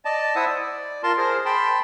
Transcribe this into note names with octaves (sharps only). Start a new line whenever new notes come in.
D5 D#5 A5
E4 C5 E5 F#5 D#6
D5
F4 A#4 A5 C6
G#4 A#4 C5
G5 A5 B5 C6